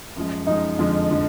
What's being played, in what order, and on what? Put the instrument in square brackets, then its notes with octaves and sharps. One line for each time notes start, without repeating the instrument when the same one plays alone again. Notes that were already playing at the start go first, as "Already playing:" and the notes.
[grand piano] F#2 F3 G#3
[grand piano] F#2 F3 G#3 [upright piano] D#4
[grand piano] F2 D3 F3 G#3
D3 F3